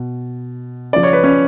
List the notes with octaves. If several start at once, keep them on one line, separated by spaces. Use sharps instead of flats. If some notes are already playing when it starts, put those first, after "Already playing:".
Already playing: B2
C#3 F3 D5
C#5
B4
C#4 C#5